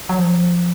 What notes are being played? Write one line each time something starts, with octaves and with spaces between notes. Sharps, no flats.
F#3
F3